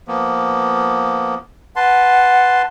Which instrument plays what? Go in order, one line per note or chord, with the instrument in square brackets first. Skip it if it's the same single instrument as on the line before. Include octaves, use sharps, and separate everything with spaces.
[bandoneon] F3 A#3 B3
[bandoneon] B4 A5 C6 [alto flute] F#5